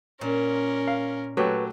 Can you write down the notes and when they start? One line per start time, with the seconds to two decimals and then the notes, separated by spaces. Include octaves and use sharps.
0.21 A#2 C#4 A#4
0.87 F5
1.37 F#3 A3 G4 B4 C#5